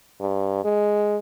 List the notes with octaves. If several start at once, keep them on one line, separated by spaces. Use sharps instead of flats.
G2
G#3